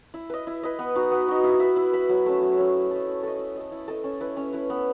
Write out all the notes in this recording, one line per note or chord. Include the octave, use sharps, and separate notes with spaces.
E4
B4 D#5
E4
B4 D#5
B3
D#4 F#4
B3
D#4 F#4
E4
B4 E5
E4
B4 E5
F#3
A3 C#4
F#3
A3 C#4
E4
A4 D#5
E4
A4 D#5
E4
A4 D#5
E4
A4 D#5
C#4
E4 B4
C#4
E4 B4
B3